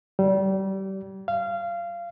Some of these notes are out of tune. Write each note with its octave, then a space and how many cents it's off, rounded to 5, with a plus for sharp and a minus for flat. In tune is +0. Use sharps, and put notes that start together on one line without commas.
G3 -30
F5 -20